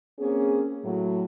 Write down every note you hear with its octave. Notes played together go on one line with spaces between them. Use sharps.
A#3 C4 C#4 G#4
A2 F#3